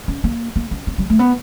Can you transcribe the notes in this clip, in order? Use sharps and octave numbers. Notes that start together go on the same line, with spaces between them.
C#4
A#3
A#3
C#4
C4
G3
A3
B3